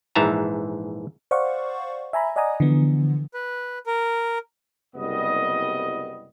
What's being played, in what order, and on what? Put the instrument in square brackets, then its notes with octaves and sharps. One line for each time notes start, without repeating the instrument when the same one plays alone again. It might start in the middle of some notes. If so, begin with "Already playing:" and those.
[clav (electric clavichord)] A#1 G#2 E3 E5 A5 A#5
[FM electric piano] C5 D5 F5 F#5 C#6
E5 G#5 A#5 B5
D5 D#5 F#5 G#5 A#5 D#6
D3 E3 F3 B3
[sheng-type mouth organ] B4
A#4
[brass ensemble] F#1 C2 C3 G3 B3 D#5